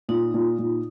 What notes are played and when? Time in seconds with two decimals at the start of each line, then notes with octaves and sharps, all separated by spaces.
0.09 A#2 D#4
0.34 A#2
0.59 A#2